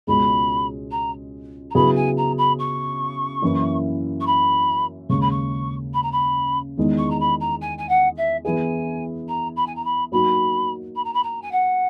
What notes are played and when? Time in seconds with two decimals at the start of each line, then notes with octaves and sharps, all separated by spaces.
0.07 C#2 B2 G#3 C#4 G#4 B5
0.91 A#5
1.70 A#5
1.75 C#3 F#3 B3 E4 G#4 B5
1.95 G#5
2.17 A#5
2.37 B5
2.59 C#6
3.42 F#2 E3 A#3 E4
4.20 C#6
4.26 B5
5.09 D#2 C#3 G#3 C#4 C#6
5.21 B5
5.30 C#6
5.93 B5
6.02 A#5
6.12 B5
6.78 E2 D#3 G#3 D#4
6.98 C#6
7.10 A#5
7.20 B5
7.40 A#5
7.61 G#5
7.78 G#5
7.88 F#5
8.17 E5
8.45 E3 B3 E4 G#4 G#5
9.28 A#5
9.56 B5
9.66 G#5
9.75 A#5
9.84 B5
10.12 F#3 A#3 D#4 F#4 B5
10.95 B5
11.04 A#5
11.13 B5
11.23 A#5
11.42 G#5
11.51 F#5